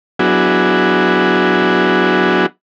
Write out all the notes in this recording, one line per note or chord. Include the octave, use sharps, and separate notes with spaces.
F#3 B3 D4 E4 F#4 G#4